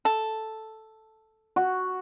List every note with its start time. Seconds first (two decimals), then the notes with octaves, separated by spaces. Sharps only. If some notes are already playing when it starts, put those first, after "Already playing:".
0.05 A4
1.56 F#4